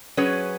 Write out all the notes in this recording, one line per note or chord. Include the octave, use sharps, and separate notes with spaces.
F#3 C#4 G#4 B4